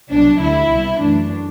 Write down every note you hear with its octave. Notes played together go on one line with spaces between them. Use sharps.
C2 B2 F#3 D4
D2 D3 G3 E4
C2 B2 G3
F#2 E3 A3 D4